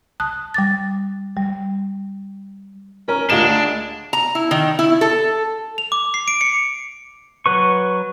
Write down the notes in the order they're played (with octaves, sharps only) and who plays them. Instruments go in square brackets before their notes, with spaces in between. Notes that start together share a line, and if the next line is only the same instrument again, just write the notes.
[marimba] A5 D#6 F#6
G3 D6 A6
G3
[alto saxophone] C#4 [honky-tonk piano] A#4 A#5
[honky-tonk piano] D2 F4 E7 [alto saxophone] G#3 [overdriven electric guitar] D4
[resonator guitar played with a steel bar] A#5
E4
D#3
E4
A4
[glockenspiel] F7
D6
C7
D7
C#7
[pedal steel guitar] F#3 B4 C#6